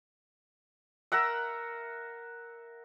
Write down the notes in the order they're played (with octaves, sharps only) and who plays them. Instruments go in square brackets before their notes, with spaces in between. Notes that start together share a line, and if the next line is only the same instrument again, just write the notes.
[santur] A#4 E5 F#5 E6